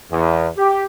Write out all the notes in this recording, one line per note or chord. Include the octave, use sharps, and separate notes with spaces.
E2
G4